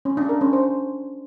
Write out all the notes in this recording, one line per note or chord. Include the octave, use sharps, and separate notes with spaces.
C#4
D4
A#4
C#4
C5